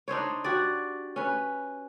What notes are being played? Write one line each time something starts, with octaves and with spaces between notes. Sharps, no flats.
D4 D#4 C5 C#5
F#4 G4 D5
C#4 B4